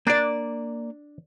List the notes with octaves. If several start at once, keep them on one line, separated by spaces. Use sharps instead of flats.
A#3 D4 D5